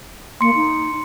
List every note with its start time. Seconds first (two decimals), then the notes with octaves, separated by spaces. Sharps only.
0.41 A#3 C6 C#7
0.56 D#4